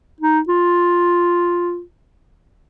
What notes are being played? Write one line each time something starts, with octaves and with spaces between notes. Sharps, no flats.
D#4
F4